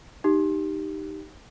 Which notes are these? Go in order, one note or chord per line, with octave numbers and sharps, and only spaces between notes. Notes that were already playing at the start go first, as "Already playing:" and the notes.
D#4 G4